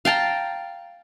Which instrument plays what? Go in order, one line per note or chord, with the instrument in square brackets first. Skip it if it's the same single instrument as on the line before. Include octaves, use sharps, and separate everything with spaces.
[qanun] F5 G5 A5 A#5